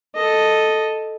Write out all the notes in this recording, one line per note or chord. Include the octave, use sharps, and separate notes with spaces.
A4 D#5